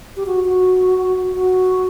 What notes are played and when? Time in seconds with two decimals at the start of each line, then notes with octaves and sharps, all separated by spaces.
0.17 G4
0.26 F#4
0.44 F#4
1.35 F#4